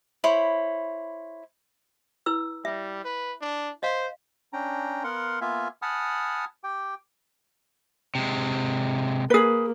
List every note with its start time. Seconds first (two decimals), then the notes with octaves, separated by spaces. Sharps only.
0.24 E4 C5 C#5 B5
2.26 E4 B4 E6
2.65 G3 E5
3.04 B4
3.41 D4
3.83 C5 D#5 F5
4.53 C#4 D4 G5 A#5
5.04 B3 A#4 F5 F#5 C6
5.41 A#3 B3 F4 E5 F5 G#5
5.82 F#5 G#5 A5 B5 D#6 F6
6.64 G4 G5
8.15 C3 G#3
9.30 A#3 G#4 B4